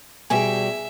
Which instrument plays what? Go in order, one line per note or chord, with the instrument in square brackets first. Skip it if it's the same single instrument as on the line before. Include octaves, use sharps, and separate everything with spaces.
[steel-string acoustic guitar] B2 G3 G5 [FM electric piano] G#4 G#5 [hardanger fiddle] E5